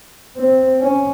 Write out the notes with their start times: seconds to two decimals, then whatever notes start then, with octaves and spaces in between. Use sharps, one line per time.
0.36 C4
0.80 C#4